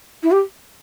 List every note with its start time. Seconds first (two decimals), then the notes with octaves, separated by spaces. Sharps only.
0.23 E4
0.31 G4